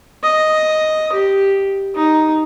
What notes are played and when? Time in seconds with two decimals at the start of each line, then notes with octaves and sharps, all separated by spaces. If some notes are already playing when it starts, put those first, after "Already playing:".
0.24 D#5
1.12 G4
1.95 D#4